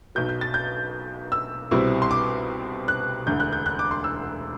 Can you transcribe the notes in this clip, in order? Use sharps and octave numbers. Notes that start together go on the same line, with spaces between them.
B1 B2 F#3 G6
G6
A6
G6
E6
C2 B2 G3 C4 E4
C6
D6
F#6
E1 D2 D3 G6
F#6
G6
F#6
D6
C6
E6